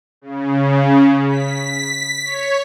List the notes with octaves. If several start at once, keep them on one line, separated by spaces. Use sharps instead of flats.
C#3
B6
C#5